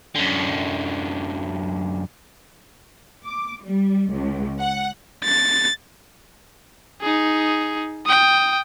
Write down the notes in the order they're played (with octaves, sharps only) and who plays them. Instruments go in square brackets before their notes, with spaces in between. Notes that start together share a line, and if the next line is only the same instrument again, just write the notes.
[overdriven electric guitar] F#2 D3
[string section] D6
G3
C#2
F#5
[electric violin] A6
D#4 G#4
G5 D#6